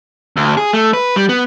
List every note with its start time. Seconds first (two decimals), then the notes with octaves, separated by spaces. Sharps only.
0.37 D2
0.57 G#4
0.73 A3
0.94 B4
1.16 G3
1.29 B3